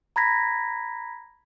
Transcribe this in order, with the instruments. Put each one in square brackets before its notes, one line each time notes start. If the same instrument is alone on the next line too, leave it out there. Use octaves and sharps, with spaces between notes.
[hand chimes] A#5 B5 G#6 A#6 B6